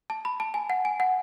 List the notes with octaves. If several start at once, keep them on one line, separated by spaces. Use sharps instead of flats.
A5
B5
A5
G#5
F#5
G#5
F#5